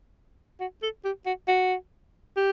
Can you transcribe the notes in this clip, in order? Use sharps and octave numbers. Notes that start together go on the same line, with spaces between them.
F#4
A4
G4
F#4
F#4
G4